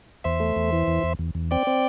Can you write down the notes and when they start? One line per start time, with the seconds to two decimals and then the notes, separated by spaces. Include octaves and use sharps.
0.24 E2 C5 E5
0.40 A3
0.56 E2
0.72 E3
0.87 E2
1.03 E2
1.19 E2
1.35 E2
1.51 C4 D5 G5
1.67 C4